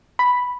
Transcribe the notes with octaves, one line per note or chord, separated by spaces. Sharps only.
B5